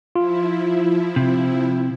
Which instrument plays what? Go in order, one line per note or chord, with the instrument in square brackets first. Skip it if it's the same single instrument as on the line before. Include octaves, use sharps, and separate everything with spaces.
[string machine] F3 E4 [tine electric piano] F4
[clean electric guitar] C3